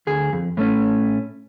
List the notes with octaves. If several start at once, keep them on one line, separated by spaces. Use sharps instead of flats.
D2 G#4
F2
A2 A3 C#4